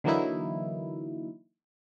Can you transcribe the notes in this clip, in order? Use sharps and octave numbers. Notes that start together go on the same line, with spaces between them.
D3 E3 F#3 A#3 D#4 E4